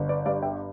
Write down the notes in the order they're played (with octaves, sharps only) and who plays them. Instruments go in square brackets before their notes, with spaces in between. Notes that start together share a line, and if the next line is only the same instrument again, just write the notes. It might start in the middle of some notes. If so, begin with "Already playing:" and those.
Already playing: [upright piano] G1
B4 D5
G2 D5 F5
E5 G5